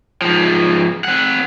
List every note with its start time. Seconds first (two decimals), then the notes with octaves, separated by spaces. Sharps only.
0.22 G#2 F3
1.04 C4 F#5